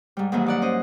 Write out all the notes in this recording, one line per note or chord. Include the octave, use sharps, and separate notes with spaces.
G#2 G3
G#2 D#3 E3 F#3 G#3 A#3
D#4 D5 F#5
C#4 C5 D#5